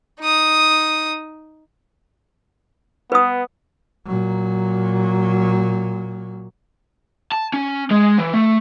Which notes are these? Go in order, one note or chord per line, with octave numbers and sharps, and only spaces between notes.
D#4 D#6
B3 B4 D#6
A#2 F#3
A5
C#4
G#3
E3
A3